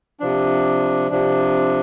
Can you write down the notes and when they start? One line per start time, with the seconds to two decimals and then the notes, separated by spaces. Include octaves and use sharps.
0.20 C3 F3 D4
1.11 C3 F3 D4